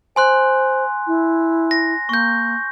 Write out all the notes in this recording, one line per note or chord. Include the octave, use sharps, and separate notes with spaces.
C5 G#5 C6 F#6
E4
A#6
A#3 C#6 G6